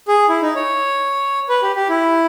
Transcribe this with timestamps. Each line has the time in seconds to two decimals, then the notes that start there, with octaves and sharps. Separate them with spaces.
0.08 G#4
0.29 E4
0.42 D#4
0.55 C#5
1.49 B4
1.62 G4
1.76 G4
1.89 E4